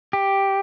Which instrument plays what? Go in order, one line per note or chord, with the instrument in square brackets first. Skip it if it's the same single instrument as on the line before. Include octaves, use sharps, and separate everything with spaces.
[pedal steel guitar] G4